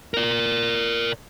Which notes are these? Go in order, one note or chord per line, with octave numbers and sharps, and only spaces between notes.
A#4 D5